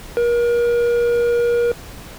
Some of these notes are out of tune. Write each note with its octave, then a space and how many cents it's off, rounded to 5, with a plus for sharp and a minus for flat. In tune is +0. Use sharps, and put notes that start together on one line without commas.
A#4 +35